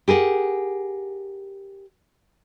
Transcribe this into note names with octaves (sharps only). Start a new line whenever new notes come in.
G4 G#4 A#4 F#5